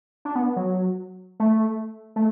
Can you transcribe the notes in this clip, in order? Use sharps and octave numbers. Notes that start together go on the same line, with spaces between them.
D4
B3
F#3
A3
A3